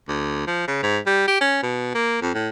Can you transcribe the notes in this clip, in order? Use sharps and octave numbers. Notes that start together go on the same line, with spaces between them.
D2
F3
C#3
G#2
G3
G4
C#4
B2
A#3
F2
A2